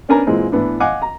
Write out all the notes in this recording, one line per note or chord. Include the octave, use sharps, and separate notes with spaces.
B3 C#4 D4 A#4 G#5 A#5
A#2 E3 G#3 C4
A2 E3 B3 D4
D#5 F5 F#5 G#5 D6
A#5